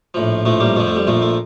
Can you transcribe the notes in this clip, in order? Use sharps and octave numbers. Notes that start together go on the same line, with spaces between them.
A#1 A2 F3
A#1 A2 F3 A3
G3 A#3
F2 D3 F3 A3
A3
G3
A#1 A#2 F3 A3
A3